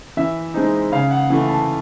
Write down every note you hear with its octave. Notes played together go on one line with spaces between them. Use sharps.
E3 E5
G#3 C4 D#4
C#3 F5
F#5
E3 A3
A5